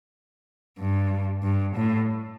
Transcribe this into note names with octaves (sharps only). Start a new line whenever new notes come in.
G2
G2
A2